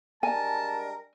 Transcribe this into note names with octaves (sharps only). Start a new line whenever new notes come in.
G3 G#3 D4 A#4 G#5 A5